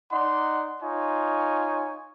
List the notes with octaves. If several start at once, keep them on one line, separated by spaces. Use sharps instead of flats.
D#4 D5 F#5 C6
D#4 F4 C#5 G#5 C#6